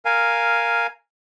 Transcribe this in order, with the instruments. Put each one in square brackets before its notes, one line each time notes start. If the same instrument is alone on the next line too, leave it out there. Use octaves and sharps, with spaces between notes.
[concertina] A#4 F5 G#5